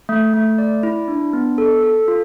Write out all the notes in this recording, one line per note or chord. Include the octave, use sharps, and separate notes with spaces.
A3
A3
D5
E4
D4
B3
A4
A4
F4